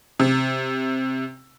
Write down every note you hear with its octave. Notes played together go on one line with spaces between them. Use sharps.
C3